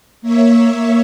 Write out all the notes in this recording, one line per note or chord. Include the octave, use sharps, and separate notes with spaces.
A#3 C#5 E5